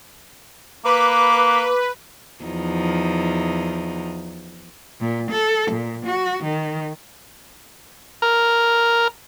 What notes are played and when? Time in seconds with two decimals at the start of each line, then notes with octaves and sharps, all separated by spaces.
0.85 A#3 B4 D6
2.44 E2 F3 D#4
5.01 A#2
5.31 A4
5.71 A#2
6.05 F#4
6.43 D#3
8.22 A#4